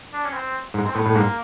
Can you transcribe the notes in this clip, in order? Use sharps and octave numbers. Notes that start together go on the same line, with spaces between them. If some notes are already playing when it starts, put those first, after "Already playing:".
D4
C#4
C4
G#2 G#3
C4
A2 B3
A2
G#2 A#3